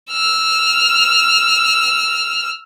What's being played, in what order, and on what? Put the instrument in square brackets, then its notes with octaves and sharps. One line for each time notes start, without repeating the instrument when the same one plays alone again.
[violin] E6 F6